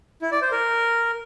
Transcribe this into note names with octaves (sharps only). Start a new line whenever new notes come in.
E4
D5
C5
A#4